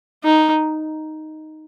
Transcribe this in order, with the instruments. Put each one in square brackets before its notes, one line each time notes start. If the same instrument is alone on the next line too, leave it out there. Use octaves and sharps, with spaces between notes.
[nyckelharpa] D#4